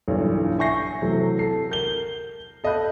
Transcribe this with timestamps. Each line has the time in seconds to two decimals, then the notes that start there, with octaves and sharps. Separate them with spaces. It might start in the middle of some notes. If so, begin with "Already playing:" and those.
0.08 B1 G2 A#2 D3 E3
0.59 E5 G#5 C#6 G6 A#6 C7
1.02 C3 E3 F#3 A3
1.39 A4 C7
1.70 A#4 G6 G7
2.64 A4 D#5 F5 B5 F#6 G6